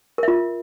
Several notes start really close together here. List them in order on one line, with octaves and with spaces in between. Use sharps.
A#4 E5 F4